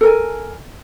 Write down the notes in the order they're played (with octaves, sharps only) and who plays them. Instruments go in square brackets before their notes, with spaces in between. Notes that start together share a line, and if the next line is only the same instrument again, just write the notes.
[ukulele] A4 A#4 G#5